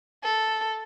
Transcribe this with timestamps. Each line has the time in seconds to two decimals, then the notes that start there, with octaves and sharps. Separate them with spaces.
0.24 A4